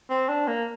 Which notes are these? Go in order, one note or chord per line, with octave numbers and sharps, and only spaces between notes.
C4
D4
A#3